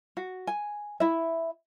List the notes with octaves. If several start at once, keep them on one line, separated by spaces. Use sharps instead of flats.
F#4
G#5
E4 E5